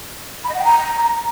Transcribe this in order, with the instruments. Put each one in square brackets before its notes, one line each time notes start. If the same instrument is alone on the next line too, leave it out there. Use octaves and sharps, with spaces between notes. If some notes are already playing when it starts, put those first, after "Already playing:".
[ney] B5
D#5
F#5
G5
A#5